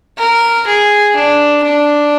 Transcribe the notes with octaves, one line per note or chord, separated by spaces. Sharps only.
A#4
G#4
D4
D4